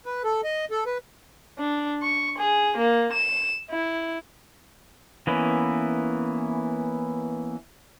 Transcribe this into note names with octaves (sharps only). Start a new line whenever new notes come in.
B4
A4
D#5
A4
B4
D4
C#6
G#4
A#3
E7
E4
E3 A#3 B3 C#4 E4